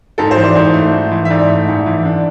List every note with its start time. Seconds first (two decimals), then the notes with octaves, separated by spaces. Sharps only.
0.18 G#2 A4
0.31 C5
0.36 E3
0.43 D5
0.55 G#2 C5
0.74 A3
0.94 G#2
1.11 E3
1.25 E5
1.30 G#2 D5
1.50 A3
1.68 G#2
1.86 E3
2.05 D4